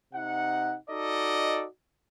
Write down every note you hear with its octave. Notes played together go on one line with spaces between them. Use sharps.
C3 D#4 F#5
D#4 F#4 A4 D5 D#5